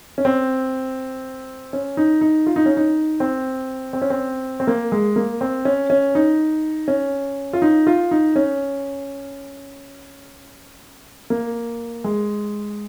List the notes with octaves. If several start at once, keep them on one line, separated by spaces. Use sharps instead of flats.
C#4
C4
C#4
D#4
D#4
F4
D#4
C#4
D#4
C4
C4
C#4
C4
C4
A#3
G#3
A#3
C4
C#4
C#4
D#4
C#4
F4
D#4
F4
D#4
C#4
A#3
G#3